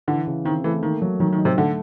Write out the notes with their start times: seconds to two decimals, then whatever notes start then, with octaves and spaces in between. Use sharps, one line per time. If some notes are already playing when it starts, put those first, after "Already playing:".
0.08 D3 E3
0.27 C#3
0.45 D#3 C4
0.64 E3 A3
0.82 D#3 A#3
1.02 F#3
1.20 D#3 F#3
1.33 D#3
1.38 D#4
1.45 C3
1.58 D3 A3